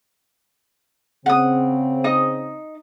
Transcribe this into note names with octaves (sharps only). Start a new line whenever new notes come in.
C#3 C4 F#5 D#6
D#4 D#5 D#6